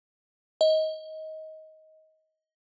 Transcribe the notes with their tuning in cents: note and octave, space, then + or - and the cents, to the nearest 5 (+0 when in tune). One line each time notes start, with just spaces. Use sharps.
D#5 +20